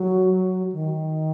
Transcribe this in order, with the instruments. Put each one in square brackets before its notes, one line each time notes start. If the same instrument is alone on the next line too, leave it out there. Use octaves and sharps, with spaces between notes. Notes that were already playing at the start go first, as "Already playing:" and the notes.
Already playing: [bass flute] F#3
D#3